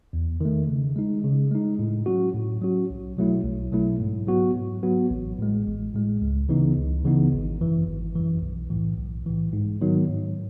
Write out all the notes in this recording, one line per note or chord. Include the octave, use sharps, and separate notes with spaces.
E2
D#3 A3
C#3
G#3 D#4
C#3
G#3 D#4
A2
F#3 C#4 F#4
A2
F#3 C#4 F#4
B1
B2 F#3 A3 E4
B1
B2 F#3 A3 E4
G#2
F#3 B3 F#4
G#2
F#3 B3 F#4
A1
A2 G#3
A1
A2 G#3
C#2
C#3 E3 B3 D#4
C#2
C#3 E3 B3 D#4
G#1
F#2 E3
G#1
F#2 E3
B1
A2 E3
B1
A2 E3
G#2
D#3 F#3 B3 D#4
G#2